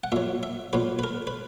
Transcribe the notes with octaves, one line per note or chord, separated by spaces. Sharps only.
F#5
A#2 F#3 E5
E5
A#2 F#3 B4
B4
A#4
B4